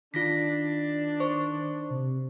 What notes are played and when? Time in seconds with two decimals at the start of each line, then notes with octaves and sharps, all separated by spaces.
0.14 D#3 D4 F4 A#6 B6
1.20 C5 C#6
1.90 C3